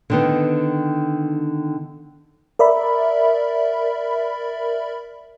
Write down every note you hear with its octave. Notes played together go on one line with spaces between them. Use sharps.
D3 D#3 B3
A#4 D5 E5 B5